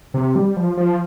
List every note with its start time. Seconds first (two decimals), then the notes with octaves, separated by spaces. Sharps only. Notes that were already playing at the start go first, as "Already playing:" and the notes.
0.14 C3
0.36 G3
0.56 F3
0.77 F3